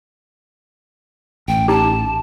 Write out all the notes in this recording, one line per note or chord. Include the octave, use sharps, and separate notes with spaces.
A1 G5
D#4 G4 A5